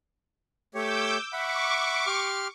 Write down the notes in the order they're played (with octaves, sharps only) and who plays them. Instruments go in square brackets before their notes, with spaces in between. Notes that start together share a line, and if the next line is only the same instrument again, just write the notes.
[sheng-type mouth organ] A3 G4 C#5 [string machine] D6 E6 G6
[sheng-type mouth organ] E5 F#5 B5 [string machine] C#6 D6
[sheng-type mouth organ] G4 C6 F6